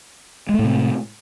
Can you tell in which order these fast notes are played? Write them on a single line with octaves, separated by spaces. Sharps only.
G#3 A3 A2 C3